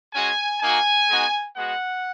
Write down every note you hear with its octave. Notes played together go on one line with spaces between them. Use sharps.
G#3 C#4 F#4 G#5
A#3 D#4 F#4 G#5
G#3 B3 D#4 F#4
G#3 B3 F#4 F#5